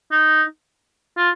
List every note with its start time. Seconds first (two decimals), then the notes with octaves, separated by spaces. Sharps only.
0.12 D#4
1.17 F4